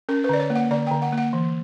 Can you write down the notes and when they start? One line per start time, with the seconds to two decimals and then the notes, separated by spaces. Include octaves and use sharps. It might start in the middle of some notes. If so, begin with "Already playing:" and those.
0.09 C#4 A#4
0.24 B4
0.29 D3 D5
0.40 C#5
0.50 A#3
0.55 F#5
0.71 D3 D5
0.87 D3 G5
1.02 F#5
1.13 A#3 F#5
1.33 E3